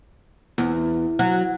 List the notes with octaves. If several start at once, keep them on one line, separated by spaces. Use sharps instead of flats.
E2
F#3